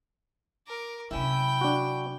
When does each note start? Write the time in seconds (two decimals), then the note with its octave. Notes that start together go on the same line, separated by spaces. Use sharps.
0.67 A#4 D6
1.11 C3 F#3 C#4 E4 G5
1.61 D4 F#4